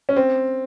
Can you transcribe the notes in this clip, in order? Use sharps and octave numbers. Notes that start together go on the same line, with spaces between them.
C#4
C4